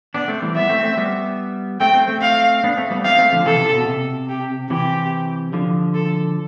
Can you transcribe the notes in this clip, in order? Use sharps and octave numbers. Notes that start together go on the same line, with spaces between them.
B3 D4 D5
A3 C4
E3 G3
G3 B3 E5
A3 C4
A3 C4
G3 B3
A3 C4 G5
A3 C4
A3 C4
F5
B3 D4
A3 C4
G3 B3
A3 C4 F5
A3 C4
D3 F3
C3 E3 A4
C3
B2
C3
G4
C3 E3 G4
D3 F3
A4